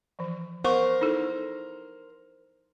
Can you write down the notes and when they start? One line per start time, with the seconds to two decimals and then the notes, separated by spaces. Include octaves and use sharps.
0.19 E3 F3
0.64 B3 A#4 C5 C#6 D6
1.01 D#4 E4 A4